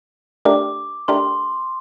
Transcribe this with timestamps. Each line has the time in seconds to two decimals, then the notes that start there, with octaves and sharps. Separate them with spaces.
0.45 A3 D4 G4 A#4 D5 D6
1.08 A3 D4 G4 A#4 D5 C6